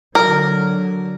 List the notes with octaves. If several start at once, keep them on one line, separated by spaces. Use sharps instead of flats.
D3 F#3 A#4